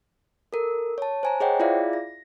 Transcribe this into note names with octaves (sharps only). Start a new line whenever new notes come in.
A4 A#4
C#5 A5
C5 G#5 A#5
G#4 C5 C#5 D#5 F#5 G5
E4 F4 G#4 D5 E5 F5
A#6